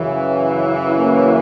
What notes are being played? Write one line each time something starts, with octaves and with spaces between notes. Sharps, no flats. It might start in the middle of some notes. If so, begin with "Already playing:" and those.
Already playing: F#2 C#3 E3
A#3 C#4